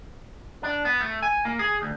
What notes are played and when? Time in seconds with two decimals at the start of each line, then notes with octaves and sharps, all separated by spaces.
0.63 D4
0.85 B3
1.01 A3
1.22 G#5
1.45 A#3
1.59 G#4
1.82 D2